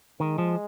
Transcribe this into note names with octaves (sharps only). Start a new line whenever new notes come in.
D#3 G#3
F3